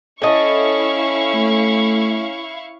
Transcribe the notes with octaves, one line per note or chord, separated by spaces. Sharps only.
C#4 E4 A4 D#5 F5 C#6
A3